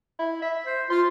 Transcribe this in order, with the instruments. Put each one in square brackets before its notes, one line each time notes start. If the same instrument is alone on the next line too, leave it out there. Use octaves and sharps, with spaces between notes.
[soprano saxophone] E4
E5
[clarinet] C5
[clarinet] F4 [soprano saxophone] C5